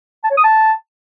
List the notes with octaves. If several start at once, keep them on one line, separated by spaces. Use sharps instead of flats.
A5
C#5
D#6
A5